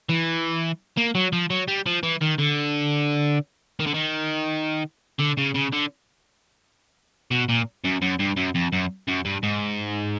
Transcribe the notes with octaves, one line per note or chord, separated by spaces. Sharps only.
E3
A#3
F#3
F3
F#3
G3
F3
E3
D#3
D3
D#3
D3
D#3
D3
C#3
C#3
D3
B2
A#2
F#2
F#2
G2
F#2
F2
F#2
F#2
G2
G#2